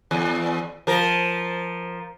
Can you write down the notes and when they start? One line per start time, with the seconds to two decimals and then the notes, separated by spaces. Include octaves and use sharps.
0.11 E2
0.87 F3 A#4